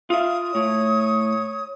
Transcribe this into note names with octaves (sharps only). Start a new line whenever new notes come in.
F4 E5 F5 D#6
A2 C#5